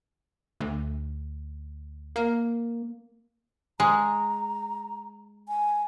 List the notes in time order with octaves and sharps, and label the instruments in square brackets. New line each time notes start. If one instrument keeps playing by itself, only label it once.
[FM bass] D2
A#3
[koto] G#3 [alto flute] A#5
[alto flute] G#5